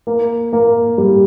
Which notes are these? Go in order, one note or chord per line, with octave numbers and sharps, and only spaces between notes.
A#3
A#3
G3